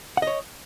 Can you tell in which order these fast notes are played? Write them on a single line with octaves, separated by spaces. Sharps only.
F#5 D#5 C#5